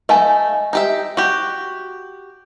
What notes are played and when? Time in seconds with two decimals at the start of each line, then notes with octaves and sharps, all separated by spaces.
0.09 A3 D#4 D#5 F5 G#5
0.73 D#4 G4 E5
1.17 F#4 G4